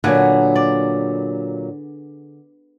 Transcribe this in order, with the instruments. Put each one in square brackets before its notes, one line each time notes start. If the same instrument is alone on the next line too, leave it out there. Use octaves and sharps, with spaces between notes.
[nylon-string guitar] A#2 F#3 [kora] D3 [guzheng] B3 G#4
[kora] D5